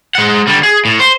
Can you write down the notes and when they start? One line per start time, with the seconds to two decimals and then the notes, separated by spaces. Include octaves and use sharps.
0.15 G#3 F#5
0.47 D3 G3
0.63 G#4
0.85 A2
1.00 C5